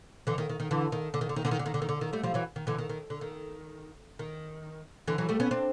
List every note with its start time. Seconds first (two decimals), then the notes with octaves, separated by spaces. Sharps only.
0.27 D3 E3
0.38 D#3
0.49 D#3
0.60 D#3
0.71 D3 E3
0.92 D#3
1.14 D3
1.21 D#3
1.29 D3
1.36 D#3
1.45 D3
1.51 D#3
1.59 D3
1.66 D#3
1.74 D3
1.82 D#3
1.89 D3
2.01 D#3
2.13 G3 A3
2.23 F3 G3
2.34 E3 F#3
2.56 D#3
2.67 D3 E3
2.78 D#3
2.89 D#3
3.10 D3
3.21 D#3
4.19 D#3
5.07 D3 E3
5.18 E3 F#3
5.29 G3 A3
5.40 B3 C#4
5.51 C4 D4